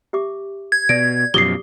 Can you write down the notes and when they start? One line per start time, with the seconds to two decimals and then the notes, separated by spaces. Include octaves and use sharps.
0.13 G4 E5 D6
0.72 G#6
0.89 B2 D5 D7
1.34 F#2 B2 F3 G4 D6 D#6 C7 G7